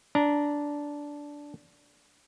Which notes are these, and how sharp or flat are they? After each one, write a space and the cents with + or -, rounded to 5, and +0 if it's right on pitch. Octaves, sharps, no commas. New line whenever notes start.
D4 -10 A#5 +0